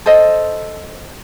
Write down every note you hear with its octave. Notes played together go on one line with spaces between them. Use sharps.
A4 C5 D#5